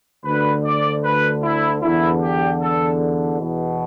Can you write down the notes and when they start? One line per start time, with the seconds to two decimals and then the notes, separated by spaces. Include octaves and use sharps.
0.24 D2 D3 B4
0.63 D5
1.03 B4
1.43 E4
1.82 E2 D3 E4
2.21 G4
2.61 A4
3.40 E2 B2